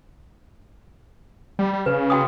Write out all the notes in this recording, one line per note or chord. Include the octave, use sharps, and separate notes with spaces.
G3
G3
C#3 B4
F#4 G5 D#6